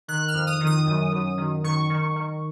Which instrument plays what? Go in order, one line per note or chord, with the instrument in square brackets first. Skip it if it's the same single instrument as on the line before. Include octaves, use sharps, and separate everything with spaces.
[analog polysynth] D#3 F#6
F6
F2
D#6
D#3
D#6
F#2
F#2
D#3
D#3 C#6
D#3
D#3